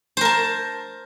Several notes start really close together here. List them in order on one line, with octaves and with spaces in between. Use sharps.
C5 A#4 A5